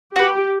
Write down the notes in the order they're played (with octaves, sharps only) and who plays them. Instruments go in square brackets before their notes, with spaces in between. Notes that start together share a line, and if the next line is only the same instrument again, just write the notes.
[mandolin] F#4 B4 [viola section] G4